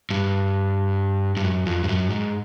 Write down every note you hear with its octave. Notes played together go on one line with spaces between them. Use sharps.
G2
G2
F#2
F2
G2
F#2
G#2